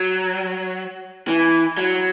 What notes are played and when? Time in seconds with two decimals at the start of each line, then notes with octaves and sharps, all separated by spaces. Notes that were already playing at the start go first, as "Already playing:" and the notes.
Already playing: F#3
1.28 E3
1.77 F#3